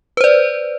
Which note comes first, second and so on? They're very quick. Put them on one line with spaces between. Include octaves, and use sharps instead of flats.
B4 C5 D5